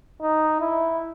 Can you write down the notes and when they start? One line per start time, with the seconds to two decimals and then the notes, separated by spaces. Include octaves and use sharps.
0.22 D#4
0.60 E4